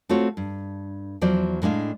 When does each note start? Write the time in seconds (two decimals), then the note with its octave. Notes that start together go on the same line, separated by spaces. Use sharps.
0.09 A3 C4 F4 F#4 C#5
0.37 G2
1.21 E2 F3 F#3 C5 D5
1.62 A2 G#3 D4 F5